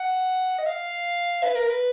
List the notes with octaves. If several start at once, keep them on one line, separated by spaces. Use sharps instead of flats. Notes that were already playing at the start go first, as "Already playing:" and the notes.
Already playing: F#5
D#5
F5
B4
A#4
B4